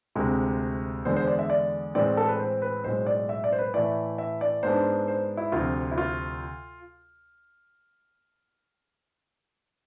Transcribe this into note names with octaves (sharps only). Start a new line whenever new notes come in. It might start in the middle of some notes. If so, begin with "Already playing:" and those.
D2 C3 G#3 C4
E2 D3 G#3 C5
C5
D5
E5
D5
A2 E3 G#3 C4 D5
A4
B4
C5
B4
B1 A2 G#3 C5
D5
E5
D5
C5
B4
A2 E3 A3 E4 D5
E5
D5
G#2 G#3 B3 D4 C5
C5
E4
D2 C3 F3 F4
E4
F4